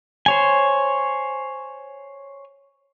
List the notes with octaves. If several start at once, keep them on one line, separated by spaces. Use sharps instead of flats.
C5 C#5 G#5